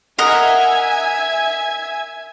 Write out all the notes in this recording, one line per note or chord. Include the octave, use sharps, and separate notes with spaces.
A#4 D#5 E5 F#5 G#5 G#6